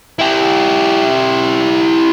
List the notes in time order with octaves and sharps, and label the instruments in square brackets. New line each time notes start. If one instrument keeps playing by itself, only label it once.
[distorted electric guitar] E4 G4